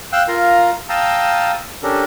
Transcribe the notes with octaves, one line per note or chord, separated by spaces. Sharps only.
F5 G5 E6 F#6
F4 A#4 F5 A#5
F5 G5 A5 A#5 D#6 E6
C#4 D4 G4 A4 A#4